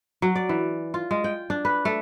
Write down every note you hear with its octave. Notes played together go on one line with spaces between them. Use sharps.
F#3
D5
E3
F4
G#3
G5
D4
B4
A3